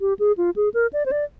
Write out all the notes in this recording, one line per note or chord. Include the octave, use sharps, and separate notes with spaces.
G4
G#4
F4
G#4
A#4
D5
C5
D5